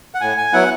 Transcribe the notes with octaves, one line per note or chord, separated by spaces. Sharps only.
F#5
A2 G#5
G#5
F#3 B3 E4 F#5